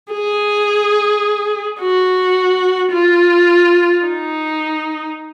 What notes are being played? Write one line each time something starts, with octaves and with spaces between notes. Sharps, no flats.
G#4
F#4
F4
D#4